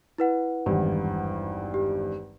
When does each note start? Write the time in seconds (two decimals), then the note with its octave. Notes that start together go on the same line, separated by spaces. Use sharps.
0.18 E4 B4 F#5
0.66 G#1 E2 G2
1.74 G4